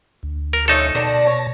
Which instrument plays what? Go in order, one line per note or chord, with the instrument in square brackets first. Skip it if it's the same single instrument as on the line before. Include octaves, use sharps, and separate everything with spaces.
[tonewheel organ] D2
[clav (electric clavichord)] A#4
[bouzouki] F3 C#4 E5 [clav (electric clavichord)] D#4 A4
[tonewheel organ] B2 A5 A#6 [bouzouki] D3 D#3 D4
[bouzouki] C#5